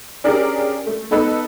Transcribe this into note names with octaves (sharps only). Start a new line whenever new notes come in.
C#4 D4 G4 G#4 A#4 D5
A3
B3 D#4 A4 B4